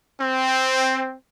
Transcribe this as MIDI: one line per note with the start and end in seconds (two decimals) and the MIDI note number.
0.21 1.16 60